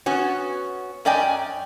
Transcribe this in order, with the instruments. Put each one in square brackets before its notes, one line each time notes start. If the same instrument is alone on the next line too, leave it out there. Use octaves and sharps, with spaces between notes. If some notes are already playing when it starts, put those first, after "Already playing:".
[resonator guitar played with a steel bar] B3 C#4 F#4
F#2 C#4 D5 D#5 G5 G#5